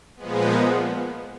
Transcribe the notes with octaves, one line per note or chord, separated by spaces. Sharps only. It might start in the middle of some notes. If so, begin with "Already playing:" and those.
A#2 F3 G#3 B3